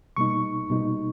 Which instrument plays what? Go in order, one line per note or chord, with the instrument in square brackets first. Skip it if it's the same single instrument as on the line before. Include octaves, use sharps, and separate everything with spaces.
[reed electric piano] B2 G3 A#3 D#4 C#6
B2 G3 A#3 D#4